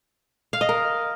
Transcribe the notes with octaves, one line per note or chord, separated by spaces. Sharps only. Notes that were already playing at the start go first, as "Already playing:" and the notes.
F5
D#5
A#4